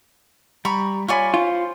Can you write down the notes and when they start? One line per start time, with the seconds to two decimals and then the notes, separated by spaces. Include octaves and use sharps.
0.65 G3 A#5 B5 C#6
1.08 F4 C#5 D5 G#5 B5 C#6
1.34 F4 C5